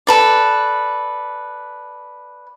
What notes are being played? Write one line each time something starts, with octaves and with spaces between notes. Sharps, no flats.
A4 B4 D5